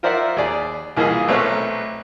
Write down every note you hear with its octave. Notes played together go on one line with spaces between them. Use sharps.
F4 A#4 C5 D5 E5 F#5
D#2 G#4 D5
C2 E3 A#3 F4 G#4 D#5
B1 A3 C4 A#4 B4 C#5